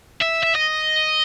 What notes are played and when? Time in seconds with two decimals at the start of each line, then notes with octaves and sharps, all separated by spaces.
0.22 E5
0.43 E5
0.56 D#5